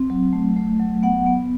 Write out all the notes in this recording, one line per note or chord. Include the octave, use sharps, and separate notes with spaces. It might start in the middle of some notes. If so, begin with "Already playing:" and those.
Already playing: C4
F#3
A3
A3
F#3
B3 F#5
B3